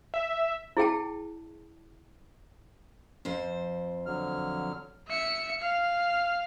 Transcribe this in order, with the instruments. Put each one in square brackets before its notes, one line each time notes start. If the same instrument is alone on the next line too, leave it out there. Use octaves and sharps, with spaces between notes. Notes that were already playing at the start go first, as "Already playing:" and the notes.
[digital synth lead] E5
[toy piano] E4 G#4 G5 A5
[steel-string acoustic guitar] F2 F3 C5
[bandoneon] D3 F#3 F6
[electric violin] E5 C#7
F5